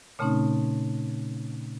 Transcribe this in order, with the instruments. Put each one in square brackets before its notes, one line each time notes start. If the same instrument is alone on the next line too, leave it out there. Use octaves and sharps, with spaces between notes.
[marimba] A#2 C#3 A3 C4 C#4 D#4